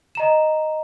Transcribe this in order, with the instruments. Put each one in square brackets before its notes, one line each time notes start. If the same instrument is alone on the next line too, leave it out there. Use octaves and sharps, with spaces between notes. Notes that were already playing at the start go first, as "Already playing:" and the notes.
[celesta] D#5 A#5 E7